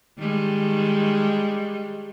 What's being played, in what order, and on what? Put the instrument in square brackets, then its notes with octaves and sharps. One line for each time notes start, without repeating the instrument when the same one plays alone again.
[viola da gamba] D#3 G3 G#3